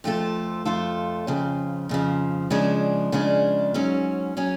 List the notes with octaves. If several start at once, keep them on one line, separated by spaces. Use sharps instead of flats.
F2 F3 A3 F4 A4
F2 F3 A3 F4 A4
F2 C#3 F3
F2 C#3 F3
C#3 F3 G#3 D4
C#3 F3 G#3 D4
G#2 F#3 C#4 G#4
F#3 C#4 G#4